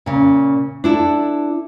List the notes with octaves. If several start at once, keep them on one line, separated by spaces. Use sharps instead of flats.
A#2 C#3
D4 E4 A4